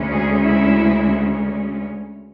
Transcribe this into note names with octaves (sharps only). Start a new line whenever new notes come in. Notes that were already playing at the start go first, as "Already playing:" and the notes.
Already playing: D2 C#3 G#3 C#4
G#4
E4